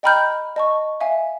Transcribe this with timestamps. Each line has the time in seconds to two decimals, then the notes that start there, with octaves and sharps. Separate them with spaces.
0.03 D#5 G5 A#5 B5 F6 G6
0.56 D#5 A5 C#6
1.01 E5 F5 G#5